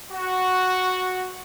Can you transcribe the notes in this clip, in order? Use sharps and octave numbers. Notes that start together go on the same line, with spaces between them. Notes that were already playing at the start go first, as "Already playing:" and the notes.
F#4